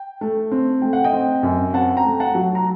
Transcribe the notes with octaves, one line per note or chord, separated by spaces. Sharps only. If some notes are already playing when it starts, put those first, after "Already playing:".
Already playing: G5
A3
C4
A3 G5
F#5
D#5 G5
C4
F#2
C4 F#5 A5
G5 A#5
A3
F#5 A5
F#3
A#5